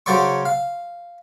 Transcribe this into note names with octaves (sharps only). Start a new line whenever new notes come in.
C#3 F#3 C5 D5 C#6
F5